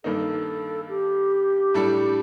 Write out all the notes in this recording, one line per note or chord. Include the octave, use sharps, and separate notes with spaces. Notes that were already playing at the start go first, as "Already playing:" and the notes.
G2 D#3 A#3 D#4 A4
G4
A2 G3 D4 A4